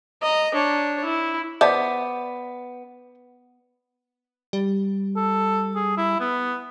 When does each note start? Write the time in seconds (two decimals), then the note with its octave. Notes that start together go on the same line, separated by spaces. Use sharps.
0.23 D#5 A#5
0.54 D4 C#5
1.05 E4
1.61 B3 C5 D5 E5 A5 D6
4.53 G3
5.16 A4
5.76 G#4
5.97 E4
6.20 B3